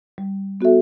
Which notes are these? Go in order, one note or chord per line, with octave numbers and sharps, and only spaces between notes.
G3
B3 F#4 A4 E5